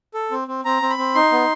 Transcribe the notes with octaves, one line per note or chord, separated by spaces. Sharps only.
A4
C4
C4
C4 A#5
C4
B5
C4
D#4 C6
B3